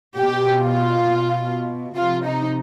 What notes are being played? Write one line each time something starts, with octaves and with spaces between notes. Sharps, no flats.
B2 G4
F4
B2
C3 F3 F4
D#4